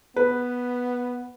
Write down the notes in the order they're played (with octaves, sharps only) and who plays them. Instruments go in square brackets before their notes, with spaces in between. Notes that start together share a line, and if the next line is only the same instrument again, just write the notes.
[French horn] B3 [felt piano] B4